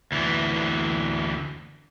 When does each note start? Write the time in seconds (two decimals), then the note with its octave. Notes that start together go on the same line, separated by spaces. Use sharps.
0.12 D2 E3